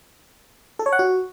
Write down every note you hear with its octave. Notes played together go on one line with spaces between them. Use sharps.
A4
C#5
F#5
F#4